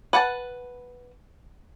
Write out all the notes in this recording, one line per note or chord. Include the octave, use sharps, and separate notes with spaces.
B4 F#5 G5 A5